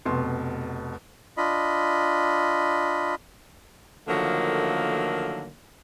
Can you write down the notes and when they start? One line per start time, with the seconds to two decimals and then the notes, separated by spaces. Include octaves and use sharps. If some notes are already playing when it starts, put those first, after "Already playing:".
0.05 F1 B2 C6
1.37 D4 F4 D#5 B5
4.08 D3 D#3 F3 F#3 A3 A#3